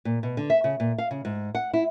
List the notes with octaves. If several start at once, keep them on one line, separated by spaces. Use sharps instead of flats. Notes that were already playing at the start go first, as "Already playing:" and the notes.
A#2
B2
D3
E5
C#3
A#2
F5
C#3
G#2
F#5
E4